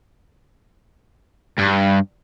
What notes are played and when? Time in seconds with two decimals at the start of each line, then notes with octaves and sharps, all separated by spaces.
1.58 G2